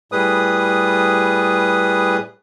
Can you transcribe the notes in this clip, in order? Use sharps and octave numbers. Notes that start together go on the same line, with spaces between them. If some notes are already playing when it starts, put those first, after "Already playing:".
A2 G3 G#4 B4 D#6